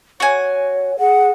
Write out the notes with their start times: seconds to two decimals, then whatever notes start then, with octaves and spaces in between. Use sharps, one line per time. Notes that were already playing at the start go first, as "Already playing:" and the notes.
0.20 F#4 C#5 G#5
0.99 G#4 F#5